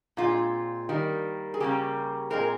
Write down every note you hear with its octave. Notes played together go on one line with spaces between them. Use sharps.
A#2 G#3 C4 F4
D#3 G3 A#3
G#4
C#3 G3 A#3 C#4 G4
A#2 G#3 C4 A#4